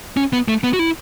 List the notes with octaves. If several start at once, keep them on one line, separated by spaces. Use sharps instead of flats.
C#4
B3
A3
B3
F#4
E4